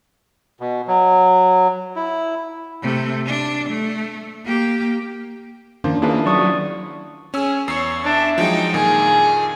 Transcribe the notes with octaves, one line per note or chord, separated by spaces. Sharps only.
B2
F#3
E4
C3 A3
D4
A3
A#3 G4
D#3 F3 A#3 C#4 D4 C5
A#3 E4 F4 G#4 B4 A5
F#3 D5 C#6 D#6
C#4 G#4 E6
E2 C#5 E6 C7
D4 E5
F3 F#3 G#3 D#4 G5
F2 A#2 D#3 G#4